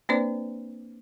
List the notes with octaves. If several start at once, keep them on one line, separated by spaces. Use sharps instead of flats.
A#3 C4 D4 B4 C5 D5